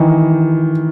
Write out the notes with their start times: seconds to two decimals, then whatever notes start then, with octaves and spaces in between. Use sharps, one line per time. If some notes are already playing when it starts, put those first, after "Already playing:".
Already playing: D#3 E3